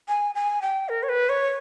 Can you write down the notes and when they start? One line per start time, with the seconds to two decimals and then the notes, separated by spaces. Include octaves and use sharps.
0.08 G#5
0.35 G#5
0.62 G5
0.89 A#4
1.03 C#5
1.09 B4
1.29 C#5